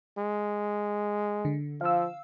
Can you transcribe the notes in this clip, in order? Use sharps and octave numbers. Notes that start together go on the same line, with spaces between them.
G#3
D3
F3 F5 E6